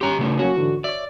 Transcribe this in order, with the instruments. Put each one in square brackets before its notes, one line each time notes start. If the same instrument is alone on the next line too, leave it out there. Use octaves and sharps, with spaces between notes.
[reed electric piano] G2 C#4 C6 [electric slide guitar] G4 A#5
[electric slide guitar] C#3 A3
[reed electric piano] F#3 A#3 C#4 [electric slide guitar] F#4
[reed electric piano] G#2 D3 E3
[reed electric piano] C#5 E5 [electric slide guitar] D5